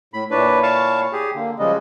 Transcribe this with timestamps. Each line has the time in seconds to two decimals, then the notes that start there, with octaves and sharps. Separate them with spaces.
0.14 A2 B5
0.31 A#2 D4 E4 B4 C#5
0.63 F5 A5 C#6
1.13 G4 G#4
1.35 D3 A#3
1.59 C#3 F3 G3 G#3 D#5